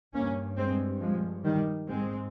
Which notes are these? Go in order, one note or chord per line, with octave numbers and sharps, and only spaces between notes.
G2 A#3 C#4
G#3 C4
F3 G#3
D#3 G3
G#2 G#3 C4